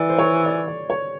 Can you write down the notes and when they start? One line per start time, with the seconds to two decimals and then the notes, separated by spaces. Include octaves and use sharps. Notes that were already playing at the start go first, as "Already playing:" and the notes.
Already playing: E3 D5
0.09 C5
0.18 C#5
0.46 D5
0.68 D5
0.90 C#5